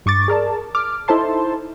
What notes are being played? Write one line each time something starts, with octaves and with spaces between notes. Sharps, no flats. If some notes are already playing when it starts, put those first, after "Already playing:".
G2 C#6 D6 A6
G#4 A#4 D5 A5
D6 F6
D#4 E4 A4 C5 A5 C6